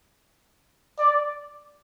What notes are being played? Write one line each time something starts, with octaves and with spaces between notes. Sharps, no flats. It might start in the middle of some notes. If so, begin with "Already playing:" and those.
D5